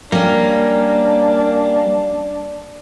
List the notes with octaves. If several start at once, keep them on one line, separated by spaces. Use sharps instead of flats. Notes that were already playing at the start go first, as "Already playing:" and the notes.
G3 A#3 C#4 D4